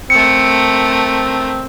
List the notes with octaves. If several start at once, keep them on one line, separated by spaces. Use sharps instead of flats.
A3 C4 A#4 C#7